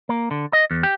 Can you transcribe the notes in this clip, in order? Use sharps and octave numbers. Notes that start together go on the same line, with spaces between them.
A#3
D3
D#5
E2
G4